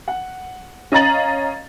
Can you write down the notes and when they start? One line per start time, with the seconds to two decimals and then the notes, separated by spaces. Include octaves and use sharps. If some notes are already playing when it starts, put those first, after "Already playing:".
0.08 F#5
0.92 C#4 D#5 F5 A#5 A6 F#7